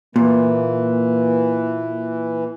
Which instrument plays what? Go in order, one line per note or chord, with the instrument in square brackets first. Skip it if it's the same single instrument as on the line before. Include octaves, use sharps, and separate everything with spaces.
[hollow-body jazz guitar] A#2 [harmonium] E3 [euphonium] A#3